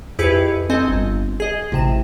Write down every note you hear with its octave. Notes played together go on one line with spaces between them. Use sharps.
F2 E4 G4 G#4 B4 C#7
C4 A4 D#5 G#5
G1
G#4 D#5
A1 C3 E7